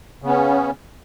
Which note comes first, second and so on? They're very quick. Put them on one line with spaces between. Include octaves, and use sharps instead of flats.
C#3 B3 C#4